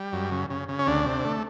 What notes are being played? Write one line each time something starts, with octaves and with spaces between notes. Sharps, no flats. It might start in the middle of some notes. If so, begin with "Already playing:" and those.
Already playing: G3
F#2
C#3
C#3
C#3
C#4
D2 D4
C3
A3